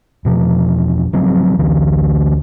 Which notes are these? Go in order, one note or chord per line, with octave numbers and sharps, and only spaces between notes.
E2 B2 F3
C#3 F3 F#3 C4
D2 D3 E3